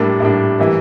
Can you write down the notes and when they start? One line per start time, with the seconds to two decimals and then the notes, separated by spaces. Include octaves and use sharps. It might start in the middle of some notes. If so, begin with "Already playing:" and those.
Already playing: A2 G3 A#3 D4
0.20 A2 G3 A#3 D4
0.59 E3 G3 A#3